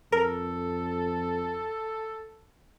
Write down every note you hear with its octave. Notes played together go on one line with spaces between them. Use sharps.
F2 A4 A#4